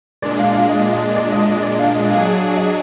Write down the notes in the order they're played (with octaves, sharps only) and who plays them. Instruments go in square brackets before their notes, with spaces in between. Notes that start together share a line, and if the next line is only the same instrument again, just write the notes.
[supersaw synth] A#2 G#3 D4 [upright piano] D5
[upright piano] F5
F5
D#5
D#5
D5
D#5
D#5
D5
F5
D#5
[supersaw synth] F#3 D4 G#4 [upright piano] F5
[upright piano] D#5